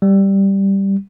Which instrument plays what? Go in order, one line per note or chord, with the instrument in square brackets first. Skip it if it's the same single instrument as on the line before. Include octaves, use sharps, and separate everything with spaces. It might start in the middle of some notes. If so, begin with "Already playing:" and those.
[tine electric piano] G3